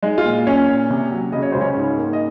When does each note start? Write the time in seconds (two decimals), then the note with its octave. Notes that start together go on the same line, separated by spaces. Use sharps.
0.03 G#3 D#4
0.18 F4
0.25 A#2
0.47 A#2 C#4 C#5
0.69 A#2
0.90 C3
1.12 F#3
1.32 C#3 D#5
1.43 C#5
1.52 C#2 C5
1.61 C#4 C#5
1.77 G#2
1.97 A#3
2.13 D#5